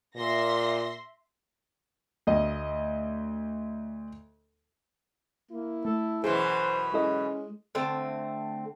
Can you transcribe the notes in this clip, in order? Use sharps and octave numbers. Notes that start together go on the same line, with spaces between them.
A#2 E5 C6 A#6
D2 D#5
A#3 E4
A3 A4
F#2 B2 E3 G#4 C5
G#3 C#4 E4 A4 D#5
D3 A3 C4